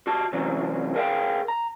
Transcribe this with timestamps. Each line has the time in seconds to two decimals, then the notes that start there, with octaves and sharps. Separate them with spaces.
0.07 F#4 G4 A5
0.32 C3 E3 F#3 C#4
0.95 G#4 A#4 D5 E5 F5 G5
1.48 A#5